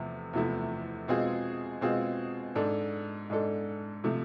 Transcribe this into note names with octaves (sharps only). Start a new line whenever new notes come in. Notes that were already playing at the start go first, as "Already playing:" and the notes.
Already playing: E2 C3 F3 A3
E2 C3 F3 A3 E4
B2 G#3 C4 F4 G#4
B2 G#3 C4 F4 G#4
G#2 G#3 D4 A4
G#2 G#3 D4 A4
C3 F3 A3